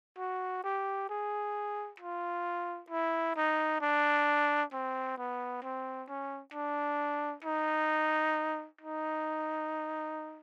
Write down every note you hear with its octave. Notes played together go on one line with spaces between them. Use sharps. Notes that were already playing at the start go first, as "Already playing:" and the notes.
F#4
G4
G#4
F4
E4
D#4
D4
C4
B3
C4
C#4
D4
D#4
D#4